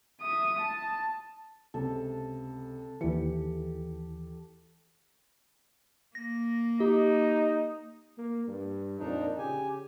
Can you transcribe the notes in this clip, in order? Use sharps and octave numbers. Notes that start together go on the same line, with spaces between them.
E5 D#6
A5
C#2 C3 A4
D#2 E3 G4 C#7
A#3 A#6
D#4 G4
A#3
G2
F2 A#2 D4 D#4
C#3 G4 G#5